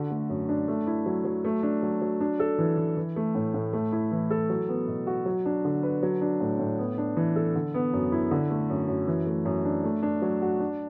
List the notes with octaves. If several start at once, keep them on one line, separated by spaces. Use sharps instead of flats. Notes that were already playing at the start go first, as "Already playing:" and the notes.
Already playing: D3 F#4
A3
F#2
D4
A3
E4
F#3
F#3
A3
D4
F#3
F#3
D4
A4
E3
E3
E3
A3
A2
A2
A3
E4
E3
A4
F#3
B3
B2
F#4
F#3
D4
D3
B4
F#3
D4
A2
A2
B3
D4
E3
A4
D3
B3
F#2
E4
D3
A3
F#2
F#2
E3
A3
F#2
D4
A3
D4
F#3
F#4
D4